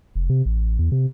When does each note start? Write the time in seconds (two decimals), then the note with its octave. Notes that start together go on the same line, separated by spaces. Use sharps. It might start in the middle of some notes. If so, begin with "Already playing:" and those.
0.16 F1
0.30 C3
0.46 A1
0.79 E2
0.92 C3